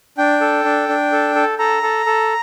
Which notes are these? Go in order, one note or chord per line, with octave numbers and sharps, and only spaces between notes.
D4 G5
A4
D4
D4
A4
A4
A4 A#5
A4
A4